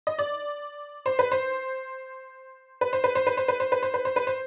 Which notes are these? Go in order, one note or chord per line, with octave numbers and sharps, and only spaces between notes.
D#5
D5
C5
B4
C5
B4
C5
B4
C5
B4
C5
B4
C5
B4
C5
B4
C5
B4
C5